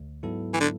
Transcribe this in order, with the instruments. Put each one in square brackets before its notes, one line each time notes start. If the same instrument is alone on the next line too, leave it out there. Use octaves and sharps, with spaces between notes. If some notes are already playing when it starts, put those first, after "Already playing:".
Already playing: [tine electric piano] D2
G#2 F#3 B3 E4 A4
[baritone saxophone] E3
D3